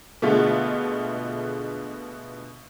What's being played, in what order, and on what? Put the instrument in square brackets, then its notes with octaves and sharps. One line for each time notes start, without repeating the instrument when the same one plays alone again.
[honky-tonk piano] B2 D3 G#3 A3 F4